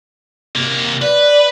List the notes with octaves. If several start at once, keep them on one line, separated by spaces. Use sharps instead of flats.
C3 A#3
B4 D5